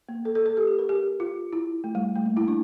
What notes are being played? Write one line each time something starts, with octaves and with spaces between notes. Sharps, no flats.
A#3
A4
A4
A4
G4
G4
A#4
G4
F4
E4
A3
G3
A3
A#3
E4
D4